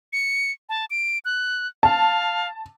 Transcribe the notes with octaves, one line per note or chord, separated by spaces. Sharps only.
C#7
A5
D7
F#6
F5 A5